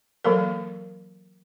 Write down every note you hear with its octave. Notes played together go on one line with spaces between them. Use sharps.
E3 F#3 A#3 A4 A#4